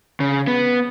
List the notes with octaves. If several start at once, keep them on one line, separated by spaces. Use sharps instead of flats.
C#3
B3